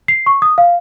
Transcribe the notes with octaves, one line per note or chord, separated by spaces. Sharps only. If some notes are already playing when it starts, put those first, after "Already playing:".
C7
C#6
D#6
F5